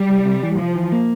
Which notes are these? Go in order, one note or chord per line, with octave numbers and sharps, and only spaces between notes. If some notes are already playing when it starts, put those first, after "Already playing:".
Already playing: G3
C2
C3
E3
C2 F3
E3
A#3